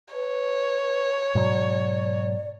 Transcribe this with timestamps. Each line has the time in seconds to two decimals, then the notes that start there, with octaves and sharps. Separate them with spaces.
0.14 B4 C#5
1.35 G#2 B2 F#3 D5